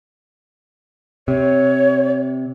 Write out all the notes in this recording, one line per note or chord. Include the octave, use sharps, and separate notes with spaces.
C3 C#5